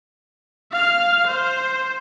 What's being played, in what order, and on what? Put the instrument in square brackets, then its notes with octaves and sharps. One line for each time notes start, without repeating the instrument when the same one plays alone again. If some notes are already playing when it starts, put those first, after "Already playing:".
[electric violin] F5 F6
C5